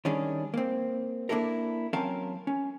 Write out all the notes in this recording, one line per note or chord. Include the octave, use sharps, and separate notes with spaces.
D#3 G3 C#4 D4 G#4
A#3 C4
A#3 D4 E4 A4 A#4
F#3 C4 C#4 A#4 F5 A5
C#4